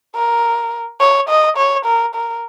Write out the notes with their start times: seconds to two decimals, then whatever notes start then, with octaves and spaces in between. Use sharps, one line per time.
0.16 A#4
1.00 C#5
1.29 D#5
1.57 C#5
1.85 A#4
2.15 A#4